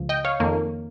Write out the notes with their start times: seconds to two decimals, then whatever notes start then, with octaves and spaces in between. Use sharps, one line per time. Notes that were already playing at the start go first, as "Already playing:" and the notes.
Already playing: C#2 C#3 F3
0.09 D#5 G5
0.25 C#5 F5
0.40 F2 D#3 A#3